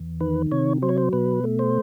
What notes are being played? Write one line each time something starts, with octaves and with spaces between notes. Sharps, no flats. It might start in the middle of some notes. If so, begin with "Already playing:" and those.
Already playing: E2
D#3 B4
C3 C#5
F#3 C5
C#5
C5
B2 B4
A3
C5